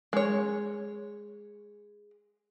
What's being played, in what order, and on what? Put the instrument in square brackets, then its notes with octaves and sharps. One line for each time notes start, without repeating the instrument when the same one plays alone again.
[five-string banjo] G#3 C#5